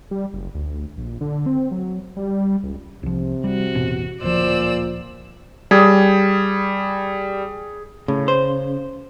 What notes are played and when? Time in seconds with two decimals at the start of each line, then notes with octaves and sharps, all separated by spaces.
0.11 G3
0.33 F#1
0.55 D2
0.97 A#1
1.21 D3
1.46 C4
1.71 F#3
2.16 G3
2.63 C#2
3.03 C2 C3 F3
3.44 G3 F#4
3.74 E1 A1 B2
4.22 D1 A#2 F3 C5 D5 E6
5.71 G3 G#4
8.08 A2 C#3
8.28 C5